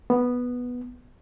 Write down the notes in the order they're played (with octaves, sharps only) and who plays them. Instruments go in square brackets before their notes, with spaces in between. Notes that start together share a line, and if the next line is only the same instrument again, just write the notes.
[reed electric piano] B3